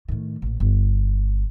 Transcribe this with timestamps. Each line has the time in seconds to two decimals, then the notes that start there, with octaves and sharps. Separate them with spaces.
0.08 A2 D#3
0.42 A1 A#2
0.60 G1